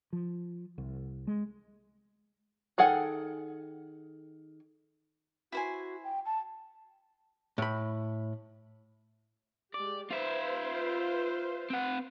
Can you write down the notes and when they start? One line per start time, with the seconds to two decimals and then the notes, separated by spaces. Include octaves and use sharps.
0.13 F3
0.78 C2
1.27 G#3
2.78 D#3 G#4 A4 F#5 G#5
5.52 E4 F#4 C5 G#5
6.04 G5
6.26 A5
7.58 A2 B5
9.74 G#3 G4 D5
10.10 F4 B4 C5 E5 F5
11.70 C4 F#5